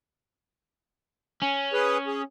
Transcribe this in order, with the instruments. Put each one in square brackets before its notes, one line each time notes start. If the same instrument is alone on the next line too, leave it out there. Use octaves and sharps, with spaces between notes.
[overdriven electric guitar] C#4
[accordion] G#4 B4
G#4